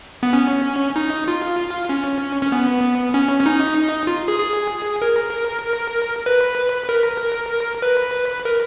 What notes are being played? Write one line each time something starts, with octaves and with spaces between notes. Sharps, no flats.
B3
C#4
D#4
F4
C#4
C#4
B3
C#4
C#4
D#4
F4
G#4
G#4
A#4
B4
A#4
B4
A#4